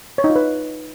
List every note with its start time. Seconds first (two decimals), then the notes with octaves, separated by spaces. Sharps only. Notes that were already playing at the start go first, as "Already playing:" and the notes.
0.18 C#5
0.24 D#4
0.30 F4
0.36 B4